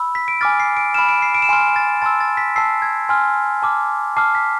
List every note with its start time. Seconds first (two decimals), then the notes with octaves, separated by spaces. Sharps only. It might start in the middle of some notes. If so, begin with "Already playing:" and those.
Already playing: B5 E6
0.15 B6
0.28 D7
0.41 G#5 D6 F6 A6
0.60 C7
0.77 D7
0.94 B5 F6 E7
1.09 D7
1.22 C7
1.35 D7
1.42 E7
1.49 G#5 C6 F6 D7
1.76 A6
2.02 A5 C6 E6 A6
2.20 A6
2.37 B6
2.56 A5 E6 C7
2.82 G#6
3.09 G#5 C6 F6
3.62 A5 D6 F6
4.17 A5 D6 F6 C7
4.35 B6